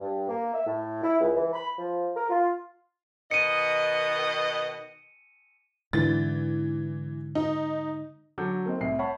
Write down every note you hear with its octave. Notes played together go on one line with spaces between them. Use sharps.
G2
A#3
E5
A2
E4
C#2
E3
B5
F3
A#4
F4
B2 D#3 D#5 C#7 D#7
G#2 D3 E3 A6
D#4
D3 F#3 A4 D6 G6
A#3 C4 D#4
C2 A2 C7
C#5 F#5 A5 B5 C#6